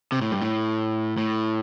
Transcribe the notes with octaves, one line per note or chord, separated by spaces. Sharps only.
C3
A2
G2
A2
A2